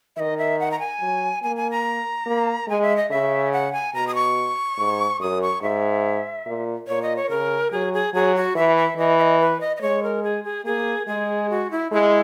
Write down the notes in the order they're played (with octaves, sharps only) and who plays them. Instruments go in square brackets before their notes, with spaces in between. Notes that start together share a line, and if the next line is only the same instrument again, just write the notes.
[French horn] D#3 [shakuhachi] D#5 E5
[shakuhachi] E5
F#5
A#5
G#5
[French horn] F#3
[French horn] A#3 [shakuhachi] G#5
[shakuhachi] G#5
A#5
[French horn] A#3
[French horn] G#3 [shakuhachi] G#5
[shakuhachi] E5
D#5
[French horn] C#3 [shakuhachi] E5
[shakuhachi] F#5
G#5
[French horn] B2 [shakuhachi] A#5
[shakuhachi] D#6
C#6
[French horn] G#2
[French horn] F#2 [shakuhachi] D#6
[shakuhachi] C#6
[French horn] G#2 [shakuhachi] E5
[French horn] A#2
[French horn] A#2 [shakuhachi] C#5
[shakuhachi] D#5
C#5
[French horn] C#3 [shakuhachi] A#4
[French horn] F#3 [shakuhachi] G#4
[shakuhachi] G#4
[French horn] F#3 [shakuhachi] G#4
[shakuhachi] F#4
[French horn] E3 [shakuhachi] E5
[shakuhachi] E5
[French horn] E3 [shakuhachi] D#5
[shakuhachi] E5
D#5
B4
D#5
D#5
[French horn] G#3 [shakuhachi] C#5
[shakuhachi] A#4
G#4
G#4
[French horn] A#3 [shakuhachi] G#4
[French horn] G#3 [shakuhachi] G#4
[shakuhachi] F#4
E4
[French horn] G#3 [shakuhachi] E4